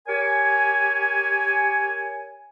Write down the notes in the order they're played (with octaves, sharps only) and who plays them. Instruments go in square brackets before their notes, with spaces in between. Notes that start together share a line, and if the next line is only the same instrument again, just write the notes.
[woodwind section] G4 A#4 C#5 G#5